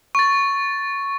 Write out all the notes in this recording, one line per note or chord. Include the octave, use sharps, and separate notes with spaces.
C#6 A6